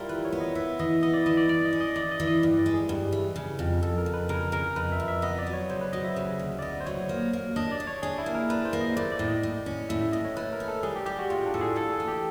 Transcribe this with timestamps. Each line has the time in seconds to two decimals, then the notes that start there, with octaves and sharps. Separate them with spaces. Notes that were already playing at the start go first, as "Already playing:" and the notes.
Already playing: G3 E4 F4 A#4
0.09 E3 B4
0.25 C#5
0.32 B3
0.40 D#5
0.55 B3 E5
0.79 E3 D#5
1.03 B3 D#5
1.14 D5
1.26 E3 D#5
1.37 D5
1.49 G2 D5
1.65 D#5
1.73 C#4
1.81 D#5
1.96 E3 D5
2.11 D#5
2.20 E3
2.28 D#5
2.43 G2
2.59 D5
2.66 G#3
2.74 G#4
2.89 G2
3.13 E3
3.36 C#3
3.59 F2
3.82 F2 A4
3.98 A#4
4.06 F2
4.14 B4
4.29 C#3 A#4
4.52 C#3 A#4
4.76 F2 B4
4.92 E5
5.00 F2
5.08 E5
5.22 B3 D#5
5.39 D5
5.47 F#3
5.53 C#5
5.70 C#3 C5
5.81 B4
5.93 F#3 D#5
6.04 E5
6.16 C#3
6.39 D2
6.59 D5
6.62 B3 D#5
6.80 C5
6.86 F#3 C#5
7.09 A#3
7.33 A#3
7.56 D4 D#5
7.72 D5
7.80 D4
7.87 C#5
8.02 D4 G#4
8.18 E4
8.26 A#3
8.35 A#4
8.50 D4 B4
8.65 C5
8.73 A#3
8.81 D#5
8.96 A3 D5
9.12 D5
9.19 A2
9.28 D#5
9.43 A2
9.66 C#4
9.89 A2 E5
10.01 E5
10.13 A2 D#5
10.25 C#5
10.36 A3 B4
10.53 A#4
10.60 C#4
10.68 A4
10.83 G3 G#4
10.95 G4
11.06 G3 G4
11.19 F#4
11.30 A2 F4
11.46 D4
11.54 A2 A4
11.61 G#4
11.76 A2 A4
11.92 G#4
12.00 E3
12.08 G4